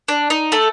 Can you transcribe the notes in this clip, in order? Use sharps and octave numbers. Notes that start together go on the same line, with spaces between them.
D4
D#4
A3 A4